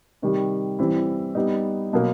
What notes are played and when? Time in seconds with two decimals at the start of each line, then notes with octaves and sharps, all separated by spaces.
0.22 C3 D#3 G3
0.79 E3 G3 C4 E4
1.35 G3 B3 D#4
1.93 B2 F#3 A#3